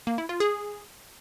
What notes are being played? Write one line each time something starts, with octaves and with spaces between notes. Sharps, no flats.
A#3
E4
F4
G#4